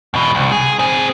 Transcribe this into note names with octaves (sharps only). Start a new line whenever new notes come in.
E2 B2
C2
G#4
C4 G#4